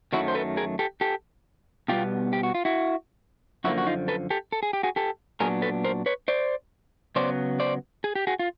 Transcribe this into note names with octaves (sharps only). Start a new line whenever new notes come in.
F#2 D#3 F#3 A3 E4 F#4
C5
A4 B4
G#4 A#4
G4 A4
G4 A4
B2 G3 B3 F4 G4
G4
F#4
F4
E4 F#4
F#2 D3 F3 A#3 E4 F#4
F#4
D#4 F4
A4 B4
G4 A4
A4
G#4
G4
F#4 G#4
G4 A4
A#2 F#3 B3 D4 G#4 A#4
A4 B4
A#4 C5
B4 C#5
C5 D5
C#3 F#3 B3 C5 D5
C5 D5
G#4
G4
F#4 G#4
F4